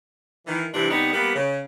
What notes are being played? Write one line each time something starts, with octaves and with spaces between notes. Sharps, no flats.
D#3 E3
G2 C3 E3 G3 D4
C3 G3 B3 D#4
G3 A#3 B3 G4 B4
C#3